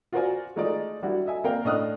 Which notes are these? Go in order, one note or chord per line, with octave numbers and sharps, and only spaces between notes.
F4 F#4 A#4 C5 D5 G#5
G#3 A3 D#4 F4 D5
F#3 G3 D4 E4 F#4
D#5 E5 G#5
A#3 C4 A#4 D5 F5 G5
A2 D4 D#5 D#6 F6 F#6